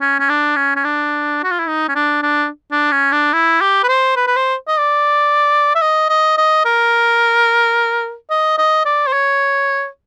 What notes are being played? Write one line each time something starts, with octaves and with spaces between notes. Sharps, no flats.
C#4
C#4
D4
C#4
C#4
D4
F#4
F4
E4
D#4
C#4
D4
D4
D4
C#4
D4
E4
G4
B4
C5
B4
B4
C5
D#5
D5
E5
D#5
D#5
D#5
A#4
D#5
D#5
D5
C5
C#5